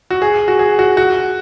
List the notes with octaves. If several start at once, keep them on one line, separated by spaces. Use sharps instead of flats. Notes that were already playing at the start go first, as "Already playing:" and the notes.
F#4
G#4
F#4
G#4
F#4
F#4